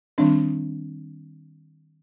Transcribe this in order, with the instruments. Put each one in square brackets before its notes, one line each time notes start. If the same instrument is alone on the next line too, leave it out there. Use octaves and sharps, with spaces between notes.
[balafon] D#3 G3 C4 D4